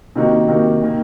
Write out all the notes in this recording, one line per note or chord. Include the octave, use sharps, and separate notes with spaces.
C3 D#3 A#3 D#4 F#4
C3 D#3 A#3 D#4 F#4
D#3 A#3